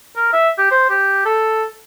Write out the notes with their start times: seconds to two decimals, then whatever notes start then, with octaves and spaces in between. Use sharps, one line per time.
0.16 A#4
0.33 E5
0.58 G4
0.71 C5
0.90 G4
1.25 A4